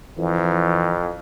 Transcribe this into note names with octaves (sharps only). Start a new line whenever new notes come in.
F2 E3